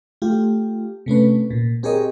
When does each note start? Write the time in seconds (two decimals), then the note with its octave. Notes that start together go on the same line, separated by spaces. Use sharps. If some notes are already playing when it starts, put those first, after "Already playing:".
0.22 A3 F4 G4
1.06 C3 A3 C#4 B4
1.51 A#2
1.83 C4 G4 G#4 A#4 C#5 D#5